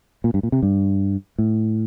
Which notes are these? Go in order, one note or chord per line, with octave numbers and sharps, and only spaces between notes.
A#2
G2
A#2
C3
G2
A2